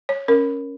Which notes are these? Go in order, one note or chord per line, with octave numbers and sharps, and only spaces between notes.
C#5
C#4 A#4